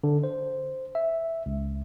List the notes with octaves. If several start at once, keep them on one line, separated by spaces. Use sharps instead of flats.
D3
C5
E5
C#2